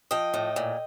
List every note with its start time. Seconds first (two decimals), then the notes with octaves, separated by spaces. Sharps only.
0.11 F3 D#5 G5
0.34 A2
0.56 A#2